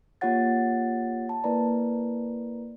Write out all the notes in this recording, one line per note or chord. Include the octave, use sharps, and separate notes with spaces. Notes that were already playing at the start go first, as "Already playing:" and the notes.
A#3 F4 G4 C#5 F#5 A6
A5
A#3 E4 A#4 B4 D5 A#5